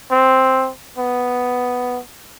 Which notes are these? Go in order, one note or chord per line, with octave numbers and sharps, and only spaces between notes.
C4
B3